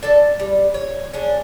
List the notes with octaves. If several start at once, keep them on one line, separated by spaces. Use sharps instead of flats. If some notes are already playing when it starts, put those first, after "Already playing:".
D4 A4 A5
G3
C#5
C#4 D4 G#4